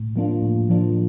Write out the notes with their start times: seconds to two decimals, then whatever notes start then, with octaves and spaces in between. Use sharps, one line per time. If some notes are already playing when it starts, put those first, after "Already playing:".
Already playing: A2
0.16 F3 A#3 D4 F4
0.42 A2
0.69 F3 A#3 D4 F4